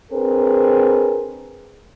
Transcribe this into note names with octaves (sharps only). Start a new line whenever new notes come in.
C4 D4 G#4 A#4 B4